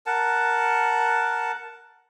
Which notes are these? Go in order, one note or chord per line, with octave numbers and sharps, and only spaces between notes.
A#4 F#5 A5